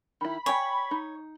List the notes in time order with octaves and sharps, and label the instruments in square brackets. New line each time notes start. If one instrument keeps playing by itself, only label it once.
[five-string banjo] D#3 E4 [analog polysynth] B5
[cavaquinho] C#5 [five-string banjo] G5 G#5
[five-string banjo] D#4